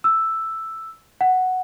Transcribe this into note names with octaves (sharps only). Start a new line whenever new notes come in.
E6
F#5